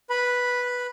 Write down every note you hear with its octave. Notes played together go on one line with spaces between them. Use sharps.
B4 B5